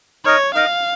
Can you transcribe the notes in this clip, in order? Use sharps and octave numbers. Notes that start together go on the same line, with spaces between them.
D#4 A#4 C#5 D#5
D#4 A#4 D#5 F5